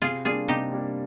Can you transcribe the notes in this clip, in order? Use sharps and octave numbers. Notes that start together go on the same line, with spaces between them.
C3 F4 G#4
G3 A#3 D4 F4 G#4
C3 D#4 G4
G3 A#3 D4